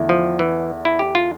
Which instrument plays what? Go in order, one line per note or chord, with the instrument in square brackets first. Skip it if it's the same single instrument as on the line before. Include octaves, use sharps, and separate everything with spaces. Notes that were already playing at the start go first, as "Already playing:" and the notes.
Already playing: [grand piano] E2 D3 A3 E4
[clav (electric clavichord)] F3
E3
E4
G4
F4